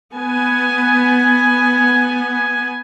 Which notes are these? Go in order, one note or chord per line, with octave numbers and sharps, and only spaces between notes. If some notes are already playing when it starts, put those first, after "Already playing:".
B3 G#5